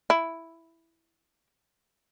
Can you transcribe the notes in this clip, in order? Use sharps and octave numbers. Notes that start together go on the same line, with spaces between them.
E4